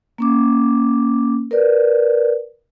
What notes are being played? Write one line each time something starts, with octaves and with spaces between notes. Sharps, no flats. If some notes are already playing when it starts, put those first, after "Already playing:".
A#3 C#4 D6
A#4 B4 D5